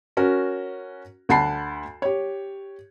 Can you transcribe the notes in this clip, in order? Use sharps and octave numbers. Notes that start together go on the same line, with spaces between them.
C#4 F#4 A#4
D2 F#5 A5 B5 C7
G4 C#5